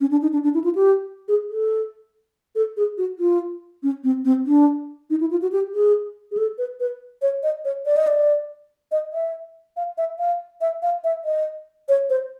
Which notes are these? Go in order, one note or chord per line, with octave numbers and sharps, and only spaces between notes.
C#4
D4
D#4
D4
D4
E4
F4
G4
G#4
A4
A4
G#4
F#4
F4
C#4
C4
C4
D4
D#4
E4
F4
F#4
G4
G#4
G#4
A4
B4
B4
C#5
D#5
C#5
D5
D#5
D5
D#5
E5
F5
E5
F5
E5
F5
E5
D#5
C#5
C5